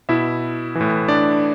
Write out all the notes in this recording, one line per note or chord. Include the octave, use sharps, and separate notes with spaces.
B2 E4 E5
E3
A2
D4 D5